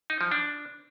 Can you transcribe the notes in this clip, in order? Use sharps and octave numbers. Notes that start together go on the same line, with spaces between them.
D#4
F3
D4